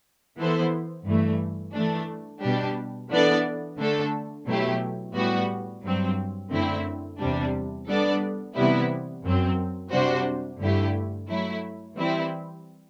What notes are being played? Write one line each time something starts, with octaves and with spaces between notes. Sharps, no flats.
E3 B3 E4 A4 C5
G2 E3 A3
E3 A3 D4
B2 G3 D4 G4
E3 B3 D4 A4 D5
D3 A3 D4 A4
B2 F#3 A3 E4 G4
A2 G3 B3 F#4
G2 F#3 C4
F#2 D3 A3 C4 E4
E2 C3 G3 D4
G3 B3 D4 A4 D5
C3 E3 G3 B3 E4
F#2 F#3 C4
C3 G3 D4 F#4 C5
G2 D3 A3 E4 G4
F#3 A3 E4
E3 G3 C4 E4